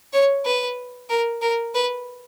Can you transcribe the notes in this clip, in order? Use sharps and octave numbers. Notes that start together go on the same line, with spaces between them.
C#5
B4
A#4
A#4
B4